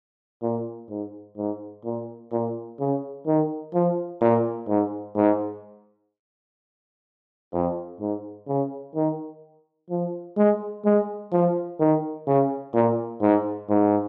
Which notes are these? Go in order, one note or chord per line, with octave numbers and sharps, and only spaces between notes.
A#2
G#2
G#2
A#2
A#2
C#3
D#3
F3
A#2
G#2
G#2
F2
G#2
C#3
D#3
F3
G#3
G#3
F3
D#3
C#3
A#2
G#2
G#2